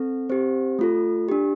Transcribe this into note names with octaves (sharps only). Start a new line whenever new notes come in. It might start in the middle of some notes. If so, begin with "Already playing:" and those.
Already playing: C4 A4
C4 G4 C5
A3 F4 A4
D4 G4